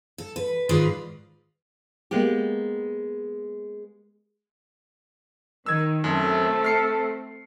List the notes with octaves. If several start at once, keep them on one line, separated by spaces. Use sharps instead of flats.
A4
B4
G#2 D#3 F4 G#4 B4 D5
G#3 A#3 B3 G4
D#3 E6 G#6
F#2 A3 C4 A4
F6 C7 C#7